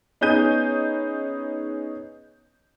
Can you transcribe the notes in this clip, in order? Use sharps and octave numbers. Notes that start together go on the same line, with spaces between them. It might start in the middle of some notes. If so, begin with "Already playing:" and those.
B3 C#4 D#4 G#4 G6 D#7